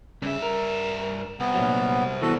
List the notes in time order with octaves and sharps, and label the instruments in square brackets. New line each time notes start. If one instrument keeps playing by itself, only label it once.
[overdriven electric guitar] G2 E5 [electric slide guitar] C#3
[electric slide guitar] A#4
[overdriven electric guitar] C2 [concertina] B3
[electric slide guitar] A#2 F#3
[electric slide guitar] E3 B3 [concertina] F#4 A4